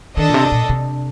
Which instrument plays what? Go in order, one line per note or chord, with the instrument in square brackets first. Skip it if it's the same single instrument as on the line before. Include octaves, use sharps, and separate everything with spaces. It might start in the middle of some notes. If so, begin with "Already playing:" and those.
[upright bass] D#3 [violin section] D4 A4 D#5
[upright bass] A#2
C3
A#2
C3